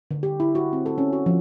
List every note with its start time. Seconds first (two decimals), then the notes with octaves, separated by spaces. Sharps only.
0.11 D3
0.23 G4
0.40 E4
0.55 F#4
0.73 C4
0.86 A4
0.98 C#4
1.13 F#4
1.26 F3